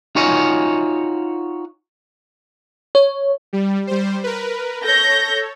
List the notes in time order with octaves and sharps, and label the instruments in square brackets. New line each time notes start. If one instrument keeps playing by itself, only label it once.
[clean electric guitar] D#4 F4 F#4 C#5 D#5 G#5
[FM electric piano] C#5
[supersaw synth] G3
G3 C5
A#4 B4
[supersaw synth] A4 C#5 [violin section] G6 A#6